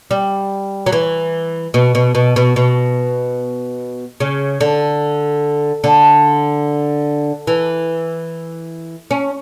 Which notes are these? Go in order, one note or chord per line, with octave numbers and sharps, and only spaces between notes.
G3
F#3
E3
B2
B2
B2
B2
B2
C#3
D3
D3
E3
C#4